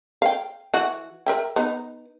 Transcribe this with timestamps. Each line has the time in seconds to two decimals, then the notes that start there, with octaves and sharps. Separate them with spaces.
0.22 F5 G5
0.74 E3 F#4
1.26 A#4 E5 G5
1.56 B3 D#4